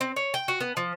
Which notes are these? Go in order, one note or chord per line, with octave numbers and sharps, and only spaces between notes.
C4
C#5
G5
F#4
B3
F3